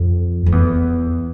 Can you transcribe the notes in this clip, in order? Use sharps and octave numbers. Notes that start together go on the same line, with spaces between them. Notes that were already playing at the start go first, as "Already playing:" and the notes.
Already playing: F2
F2
E2